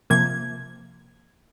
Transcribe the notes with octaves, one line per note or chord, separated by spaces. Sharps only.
C3 F3 A#3 G#6